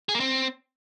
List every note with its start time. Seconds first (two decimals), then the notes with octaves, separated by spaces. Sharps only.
0.09 G#4
0.15 A#3
0.20 C4